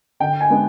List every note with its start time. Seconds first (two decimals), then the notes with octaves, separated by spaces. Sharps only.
0.20 D3 G5
0.41 G#5
0.50 G#3 B3 D4